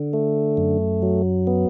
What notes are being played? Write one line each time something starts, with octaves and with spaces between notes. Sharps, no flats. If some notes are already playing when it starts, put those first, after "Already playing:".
Already playing: D3
A3
F#2
F#3
B3